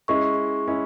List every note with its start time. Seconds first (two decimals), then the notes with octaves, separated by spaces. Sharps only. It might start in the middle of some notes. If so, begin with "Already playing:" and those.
0.08 G#3 C#4 E4 C#6
0.68 G#3 C#4 E4